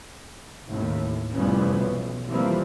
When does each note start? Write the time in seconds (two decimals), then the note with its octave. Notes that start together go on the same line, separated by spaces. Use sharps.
0.66 A1 D#2 A2
1.33 F1 E3 F3 G3 B3 C#4
1.76 B1
2.27 E3 F3 G3 A#3 C4